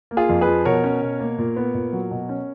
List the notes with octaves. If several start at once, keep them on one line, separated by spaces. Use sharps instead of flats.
A#3
F4 G#4
F2
G#4 B4
F3
B2 A#4 C#5
C#4
B2
A#3
A#2
B3
A#2
F#3
B2
C#4